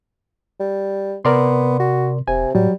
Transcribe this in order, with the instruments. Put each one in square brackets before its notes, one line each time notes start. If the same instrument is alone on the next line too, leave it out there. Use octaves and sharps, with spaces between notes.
[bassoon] G3
[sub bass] C3 [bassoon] B3 [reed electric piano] A#4 D5 C6
[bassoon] F#4
[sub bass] E1 [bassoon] C3 [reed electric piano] G#5
[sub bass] A2 [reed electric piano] F#3 [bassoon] G3